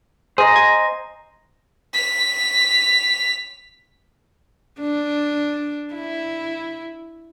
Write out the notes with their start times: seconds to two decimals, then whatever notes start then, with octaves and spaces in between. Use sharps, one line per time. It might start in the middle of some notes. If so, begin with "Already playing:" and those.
0.38 G#4 C5 D#5 A#5
0.56 G#5
1.94 B6 F7
4.80 D4
5.94 E4